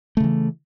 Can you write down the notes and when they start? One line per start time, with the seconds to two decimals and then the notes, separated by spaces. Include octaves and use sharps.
0.17 A3
0.20 C#3
0.24 E3